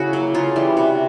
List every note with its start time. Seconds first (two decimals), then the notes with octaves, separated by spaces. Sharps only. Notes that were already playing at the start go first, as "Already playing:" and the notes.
Already playing: C#3 E4 F#4
0.13 F#3 A#3
0.35 C#3 F4
0.56 E3 G3
0.77 C3 F#4